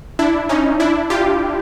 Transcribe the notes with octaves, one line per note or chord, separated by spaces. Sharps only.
D4 E4
C#4 D#4
D4 E4
F4 G4